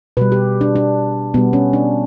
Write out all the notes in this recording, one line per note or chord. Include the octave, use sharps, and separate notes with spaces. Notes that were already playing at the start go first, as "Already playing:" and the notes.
B2 G3 B4
G4
D4
D4
B2 G3 B3
C#4
D4